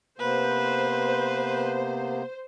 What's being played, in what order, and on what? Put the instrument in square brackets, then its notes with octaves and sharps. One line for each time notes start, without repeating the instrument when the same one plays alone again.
[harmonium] C3 A#3 B3 [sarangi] B4 [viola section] C5